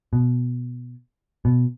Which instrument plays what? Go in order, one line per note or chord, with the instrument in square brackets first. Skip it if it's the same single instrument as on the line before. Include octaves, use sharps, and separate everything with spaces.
[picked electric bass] B2
B2